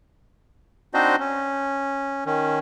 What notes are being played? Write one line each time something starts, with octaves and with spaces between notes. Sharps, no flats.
C4 D4 D#4 F#4 C5 D#5
C#4
D#3 C#4